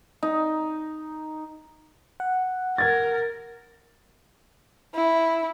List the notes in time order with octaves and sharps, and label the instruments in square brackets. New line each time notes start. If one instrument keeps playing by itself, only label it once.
[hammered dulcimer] D#4
[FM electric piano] F#5
[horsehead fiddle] A#4 [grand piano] G#6 A6
[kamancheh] E4